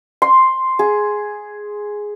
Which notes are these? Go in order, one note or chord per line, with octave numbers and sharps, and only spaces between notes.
C6
G#4